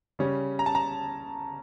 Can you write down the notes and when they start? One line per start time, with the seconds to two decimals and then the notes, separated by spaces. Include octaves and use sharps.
0.19 C#3 G3 C#4
0.59 A#5
0.66 A5
0.75 A#5